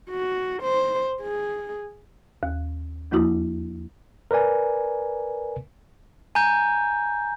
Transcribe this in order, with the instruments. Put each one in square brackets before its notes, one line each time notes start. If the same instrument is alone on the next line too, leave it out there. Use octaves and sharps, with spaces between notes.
[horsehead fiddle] F#4
C5
G#4
[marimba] D#2
E2 F3 A#3 E4 F#4 D#6
[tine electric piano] A#4 B4 D5 G#5
[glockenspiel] G#5 A#5 G6